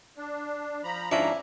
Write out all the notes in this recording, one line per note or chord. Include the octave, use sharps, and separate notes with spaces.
D4
F3 A#5 B5
G#2 F3 C#4 D4 E4 A#5